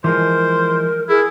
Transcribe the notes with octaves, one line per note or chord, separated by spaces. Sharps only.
E3 F3 G#3 A#4 C5
E4 G#4 A#4